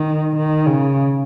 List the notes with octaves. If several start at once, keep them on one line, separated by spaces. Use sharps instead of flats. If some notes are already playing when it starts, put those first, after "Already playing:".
Already playing: D#3
D#3
C#3